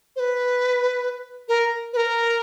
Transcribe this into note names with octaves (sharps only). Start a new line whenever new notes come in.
C5
B4
A#4
B4
A#4